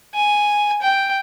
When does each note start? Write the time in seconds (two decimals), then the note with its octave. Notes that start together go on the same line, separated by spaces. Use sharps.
0.15 G#5
0.82 G5